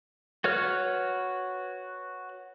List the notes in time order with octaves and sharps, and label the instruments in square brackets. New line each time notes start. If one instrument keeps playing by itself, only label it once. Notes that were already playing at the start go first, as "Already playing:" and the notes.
[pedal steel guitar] F#4 B4 C#5 F6